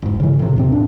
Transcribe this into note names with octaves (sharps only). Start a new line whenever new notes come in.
E1 G#2
C#3 E3
A2 C3
D#2 C3 C4
D4